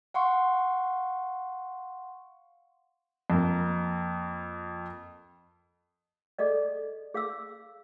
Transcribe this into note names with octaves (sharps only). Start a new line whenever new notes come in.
F5 F#5 C6 C#6
F2 A#3
G#4 A4 D5 D#5
G#4 F5 D6 E6